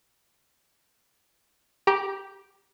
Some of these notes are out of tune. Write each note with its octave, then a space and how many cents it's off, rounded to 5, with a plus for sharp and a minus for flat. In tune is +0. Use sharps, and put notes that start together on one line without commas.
G4 +0 A#5 +40 D6 +0